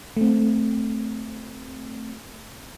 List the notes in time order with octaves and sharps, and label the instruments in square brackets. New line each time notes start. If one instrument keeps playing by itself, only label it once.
[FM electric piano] A3 C4